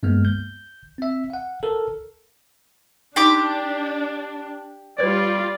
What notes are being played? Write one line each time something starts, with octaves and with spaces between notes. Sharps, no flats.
G2 G#3 A#3 B3 F6
G6
C4 E5
F5 F#5
A4 A#4
D4 D#4 G4 C6 D6
G3 F4 B4 C#5 D5